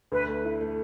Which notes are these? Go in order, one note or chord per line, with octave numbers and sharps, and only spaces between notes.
D2 B4
A3
E4
A3